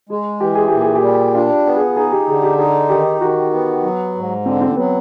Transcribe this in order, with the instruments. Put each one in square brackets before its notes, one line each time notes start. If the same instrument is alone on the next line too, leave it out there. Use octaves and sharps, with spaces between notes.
[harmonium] G#3 [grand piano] G#4
[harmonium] E3 [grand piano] G4
[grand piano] G#4
[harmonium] A#2 [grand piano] G4
[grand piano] G#4
G4
[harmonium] G3
[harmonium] D4 [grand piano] F4
[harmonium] B3
[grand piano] G#4
[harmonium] D#4 [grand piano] G#4
[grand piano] G4
[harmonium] D3 [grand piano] G#4
[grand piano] G4
[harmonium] D#4 [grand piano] G#4
[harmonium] D#3 [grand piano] G4
[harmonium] D#3 [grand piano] F#4
[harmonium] B3
F#3
G#2
[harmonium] D3 [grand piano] C4
[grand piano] C4
C4
[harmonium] F#3 [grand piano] B3